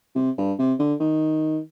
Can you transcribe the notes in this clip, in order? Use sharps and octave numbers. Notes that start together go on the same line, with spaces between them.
C3
G2
C3
D3
D#3